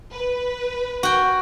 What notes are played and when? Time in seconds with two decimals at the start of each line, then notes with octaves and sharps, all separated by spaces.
0.14 B4
1.03 F#4 G5